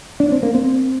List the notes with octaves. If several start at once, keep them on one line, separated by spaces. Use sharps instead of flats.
D4
C4
A#3
C4